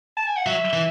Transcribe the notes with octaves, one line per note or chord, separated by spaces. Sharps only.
A5
G#5
F#5
F#3 E5
E3